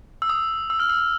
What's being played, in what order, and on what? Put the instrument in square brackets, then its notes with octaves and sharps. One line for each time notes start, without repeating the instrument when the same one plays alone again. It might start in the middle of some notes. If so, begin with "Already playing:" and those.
[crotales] E6
D#6
E6
F6
E6